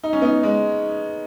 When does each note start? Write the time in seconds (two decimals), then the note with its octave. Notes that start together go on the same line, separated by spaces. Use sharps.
0.03 D#4
0.13 C#4
0.22 B3 D#4
0.43 G#3